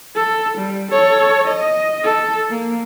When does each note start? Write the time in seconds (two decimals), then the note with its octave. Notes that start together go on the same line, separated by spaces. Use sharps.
0.16 A4
0.58 G3
0.92 A4 C#5
1.47 D#5
2.04 A4
2.50 A#3